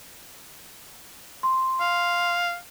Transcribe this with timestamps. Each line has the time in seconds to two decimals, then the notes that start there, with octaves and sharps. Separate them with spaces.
1.43 C6
1.81 F5